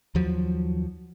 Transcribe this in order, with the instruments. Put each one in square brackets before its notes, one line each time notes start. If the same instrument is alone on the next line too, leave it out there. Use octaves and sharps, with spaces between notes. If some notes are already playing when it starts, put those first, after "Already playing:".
[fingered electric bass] D#2 F3 F#3